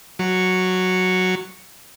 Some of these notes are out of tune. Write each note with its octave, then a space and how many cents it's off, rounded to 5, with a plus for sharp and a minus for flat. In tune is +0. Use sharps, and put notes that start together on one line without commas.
F#3 +0 C#6 +0